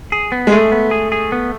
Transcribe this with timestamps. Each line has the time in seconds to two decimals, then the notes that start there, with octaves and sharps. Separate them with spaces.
0.12 G#4
0.32 B3
0.47 G#3
0.52 A3 G#4
0.72 B3
0.91 G#4
1.12 G#4
1.32 B3